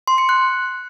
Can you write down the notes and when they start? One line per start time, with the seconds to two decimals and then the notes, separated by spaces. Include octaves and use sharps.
0.07 C6
0.18 C#7
0.29 F#6